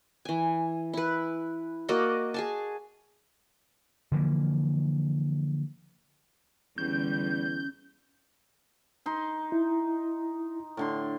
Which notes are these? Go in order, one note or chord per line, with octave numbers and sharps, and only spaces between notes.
E3 G#5
E4 B4
A#3 F#4 D5 D#5
G#4 G#5 A5
D3 E3 F3 A#3
E2 D3 G3 C#4 G6
D#4 C6
E4
A2 D3 C6